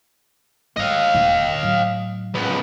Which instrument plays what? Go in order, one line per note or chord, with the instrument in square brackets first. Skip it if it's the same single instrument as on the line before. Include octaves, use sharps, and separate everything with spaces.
[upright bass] G#3 C4 [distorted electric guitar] D#5 F5
[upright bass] D#1 E2
A2 F#3
[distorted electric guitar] C#2 B3